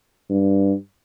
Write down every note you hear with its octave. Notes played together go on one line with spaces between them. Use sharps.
G2